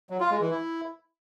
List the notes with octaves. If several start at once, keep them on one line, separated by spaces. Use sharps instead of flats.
F#3
F4
G#3
E3
E4